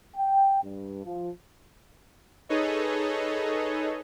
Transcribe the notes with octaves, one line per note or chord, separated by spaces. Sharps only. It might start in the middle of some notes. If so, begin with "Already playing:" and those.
G5
G2
F3
D#4 G#4 A4 B4 C#5 D#5